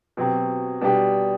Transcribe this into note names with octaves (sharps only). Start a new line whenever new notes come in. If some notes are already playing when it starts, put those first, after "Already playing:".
B2 F#3 C4 G4
B2 G3 D4 G4